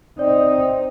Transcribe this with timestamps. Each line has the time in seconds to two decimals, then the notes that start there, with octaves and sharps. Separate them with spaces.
0.19 C4 D#4 D5